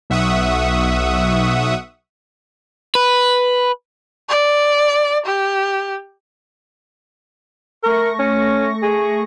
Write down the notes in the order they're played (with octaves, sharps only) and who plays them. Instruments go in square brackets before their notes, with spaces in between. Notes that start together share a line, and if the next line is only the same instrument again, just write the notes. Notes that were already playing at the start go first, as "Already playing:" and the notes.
[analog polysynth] B1 E5 F#5 C#6 D#6
[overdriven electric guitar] B4
[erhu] D5
G4
[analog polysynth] A3 C#6 A#6 [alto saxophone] A#4
[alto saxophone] C#4
G#4